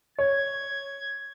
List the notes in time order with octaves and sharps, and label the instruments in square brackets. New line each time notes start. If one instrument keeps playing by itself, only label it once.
[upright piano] C#5 [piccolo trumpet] G#6